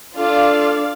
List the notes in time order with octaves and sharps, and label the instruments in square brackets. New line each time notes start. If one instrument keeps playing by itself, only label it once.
[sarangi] D4 [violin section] F4 [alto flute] A4 [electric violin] D5 F5